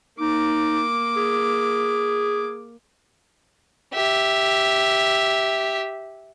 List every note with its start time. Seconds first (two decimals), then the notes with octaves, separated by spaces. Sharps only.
0.20 A#3 D#4 D6
1.16 G#4
3.93 G4 E5